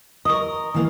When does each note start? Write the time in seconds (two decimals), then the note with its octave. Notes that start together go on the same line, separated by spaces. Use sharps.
0.25 A#4 D#5 C#6 D#6
0.74 E3 A#3